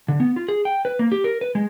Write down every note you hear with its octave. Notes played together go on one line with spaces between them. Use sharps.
D3
B3
F4
G#4
G5
B4
A#3
G4
A#4
B4
G#3